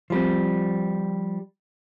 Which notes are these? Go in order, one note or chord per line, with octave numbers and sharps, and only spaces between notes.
F3 G3 C4